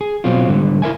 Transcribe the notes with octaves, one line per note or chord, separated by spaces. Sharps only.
G#4
B2 F#3 C4 F4
G#2 D3 G3
E4 A#4 E5 G#5